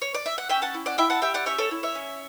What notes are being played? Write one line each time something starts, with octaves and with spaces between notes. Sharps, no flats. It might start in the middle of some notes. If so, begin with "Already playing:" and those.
C#5
D5
E5
F#5
C#4 E5 G5
F#5 A5
E4
D5 F#5
E4 E5 G5
F#5 A5
G4 E5 G5
D5 F#5
C#4 C#5 E5
A4 C#5
E4
C#5 E5
C#4